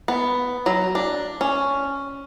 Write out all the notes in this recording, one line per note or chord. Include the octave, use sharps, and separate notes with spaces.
B3
F#3
D4
C#4